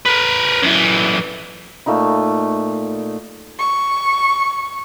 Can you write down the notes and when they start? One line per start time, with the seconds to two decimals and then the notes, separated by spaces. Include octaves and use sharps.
0.06 A#4 B4
0.62 F#2 E3
1.86 A#2 A3 D#4 B5
3.59 C#6